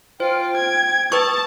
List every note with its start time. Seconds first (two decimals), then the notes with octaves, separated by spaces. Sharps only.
0.20 F4 C5 G5
0.56 G#6
1.12 B4 A5 C#6 D#6